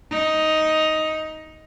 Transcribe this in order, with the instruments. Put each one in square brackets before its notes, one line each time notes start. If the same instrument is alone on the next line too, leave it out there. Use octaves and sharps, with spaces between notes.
[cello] D#4